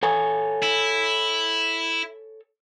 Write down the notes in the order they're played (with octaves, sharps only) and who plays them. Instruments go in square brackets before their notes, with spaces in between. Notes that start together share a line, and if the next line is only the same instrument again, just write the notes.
[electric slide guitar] A4 C#5 G#5
[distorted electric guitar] E4